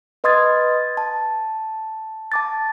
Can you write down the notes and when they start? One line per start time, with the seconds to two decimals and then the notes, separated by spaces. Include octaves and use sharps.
0.24 B4 D#5 C6 D#6 G#6 A6
0.97 A5
2.32 A5 D6 A6